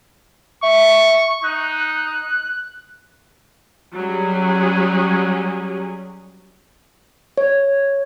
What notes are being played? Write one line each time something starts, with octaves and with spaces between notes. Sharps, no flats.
E5 C#6
D#4 F#6
F#3 G3 C#4 G4 G#4
C#5